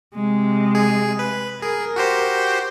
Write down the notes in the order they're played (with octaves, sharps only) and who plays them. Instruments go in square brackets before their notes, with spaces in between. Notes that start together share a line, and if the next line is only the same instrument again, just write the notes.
[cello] C3 G#3
[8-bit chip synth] G#4
B4
[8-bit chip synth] G#4 [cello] A#4
[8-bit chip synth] F#4 G4 C5